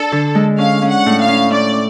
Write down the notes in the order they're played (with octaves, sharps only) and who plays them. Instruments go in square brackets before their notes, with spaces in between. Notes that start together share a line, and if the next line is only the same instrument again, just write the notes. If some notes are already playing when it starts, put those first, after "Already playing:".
Already playing: [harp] D4 [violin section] A4
[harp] D3
G#3
[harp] C#4 [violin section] F5
[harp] C#4
[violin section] F#5
[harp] A2
[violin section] F5
[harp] C#4
[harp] C#4 [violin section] D5